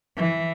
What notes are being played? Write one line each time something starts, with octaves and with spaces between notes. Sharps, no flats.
E3